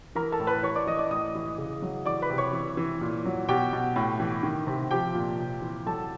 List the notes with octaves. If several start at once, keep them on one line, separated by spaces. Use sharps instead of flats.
E3 A#4 A#5
A4 A5
A2
B4 B5
E3 C#5 C#6
D5 D6
E3 D#5 D#6
D5 D6
A2 D#5 D#6
E3
C#3
F#3
E3 D5 D6
B4 B5
C3
C#5 C#6
E3
E3
A#2
F#3
B2 G4 G5
B2
A2
E3
D#3
C3
F3 G4 G5
A#2
C3
E3
F#3 A4 A5